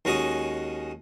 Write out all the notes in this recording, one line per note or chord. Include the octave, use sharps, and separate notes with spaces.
D#2 G#3 C#4 F#4 D#5 D#6